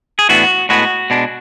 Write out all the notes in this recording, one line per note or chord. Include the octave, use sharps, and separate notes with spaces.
G#4
A2 E3 B3 D4 F#4
A2 G#3 B3 F#4
B2 G#3 D4